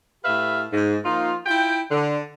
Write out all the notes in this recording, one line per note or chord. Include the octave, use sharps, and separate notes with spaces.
A2 G4 B4 E5 F5
G#2
F3 A#3 D#4 F4
E4 F4 G5
D3